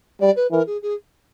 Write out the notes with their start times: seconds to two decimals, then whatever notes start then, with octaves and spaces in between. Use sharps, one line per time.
0.21 G3 D5
0.36 B4
0.51 E3 A#4
0.67 G#4
0.82 G#4